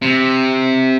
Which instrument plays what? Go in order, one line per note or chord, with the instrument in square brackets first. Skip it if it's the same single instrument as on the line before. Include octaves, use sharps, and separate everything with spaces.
[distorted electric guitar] C3